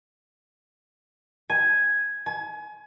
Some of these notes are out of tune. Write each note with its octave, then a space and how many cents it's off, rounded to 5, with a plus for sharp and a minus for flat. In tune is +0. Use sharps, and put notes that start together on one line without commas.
G#5 +0
G#5 +30